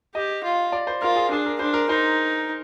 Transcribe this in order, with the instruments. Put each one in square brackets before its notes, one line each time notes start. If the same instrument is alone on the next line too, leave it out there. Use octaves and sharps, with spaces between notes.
[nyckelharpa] G4 [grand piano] D#5
[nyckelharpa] F4
[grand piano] D5
C5
[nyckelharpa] F4 [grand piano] A#4
[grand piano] G#4
[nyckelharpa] D4 [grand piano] G#4
[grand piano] A#4
[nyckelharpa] D4 [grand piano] C5
[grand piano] A#4
[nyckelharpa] D#4 [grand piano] C5